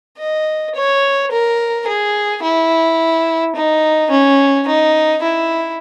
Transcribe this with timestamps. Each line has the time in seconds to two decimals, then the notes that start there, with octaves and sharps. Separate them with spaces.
0.18 D#5
0.74 C#5
1.31 A#4
1.87 G#4
2.43 E4
3.55 D#4
4.11 C#4
4.67 D#4
5.22 E4